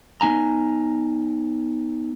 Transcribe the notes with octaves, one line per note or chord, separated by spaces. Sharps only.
B3 D#4 G#5 A#5